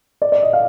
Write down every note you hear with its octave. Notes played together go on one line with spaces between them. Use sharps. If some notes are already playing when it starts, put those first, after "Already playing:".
D5
D5
D#5
F5